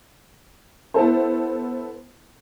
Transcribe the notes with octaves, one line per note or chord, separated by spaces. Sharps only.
B3 E4 A4 C5